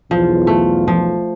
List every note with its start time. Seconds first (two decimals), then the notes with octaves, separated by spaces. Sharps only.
0.11 B1 E2 F3 F4
0.47 A3
0.88 F3